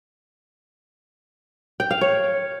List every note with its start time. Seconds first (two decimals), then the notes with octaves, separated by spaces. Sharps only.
1.80 G5
1.91 F5
2.01 C#5